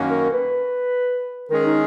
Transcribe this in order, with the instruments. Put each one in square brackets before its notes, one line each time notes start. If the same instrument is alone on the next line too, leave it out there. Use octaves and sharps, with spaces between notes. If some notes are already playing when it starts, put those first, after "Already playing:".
Already playing: [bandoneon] F#2 D#3 A#3 C#4 F#4
[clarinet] A#4
B4
[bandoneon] D#3 G#3 C#4 G#4 [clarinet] A#4
[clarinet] D#4